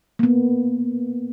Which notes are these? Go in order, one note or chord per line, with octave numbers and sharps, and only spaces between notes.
A#3 B3